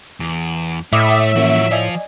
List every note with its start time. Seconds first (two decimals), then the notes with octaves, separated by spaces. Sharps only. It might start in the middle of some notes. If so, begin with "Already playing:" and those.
0.20 E2
0.93 A2 A3 D#5 E5 D6 D#6
1.36 E3 F3 A#3 C#4 F#4
1.71 F3 F4 D5 D#5 G#5